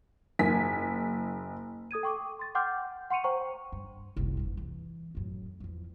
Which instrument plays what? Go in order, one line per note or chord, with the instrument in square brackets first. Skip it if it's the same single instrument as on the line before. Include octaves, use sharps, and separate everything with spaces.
[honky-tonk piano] F#1 G#5 B6
[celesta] A4 D#6 G#6 D#7
G5 C#6 D6
C6 A6
F#5 G5 C6 D6 F6 G6
F#5 C6 C#6 C#7 D#7 F7
C5 G5 A#5 C#6
[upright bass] G2
F#1 C2
E2 G2
E3
F#2 A2
E2 F3